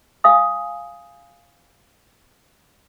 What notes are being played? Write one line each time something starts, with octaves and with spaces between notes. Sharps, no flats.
F5 G#5 D#6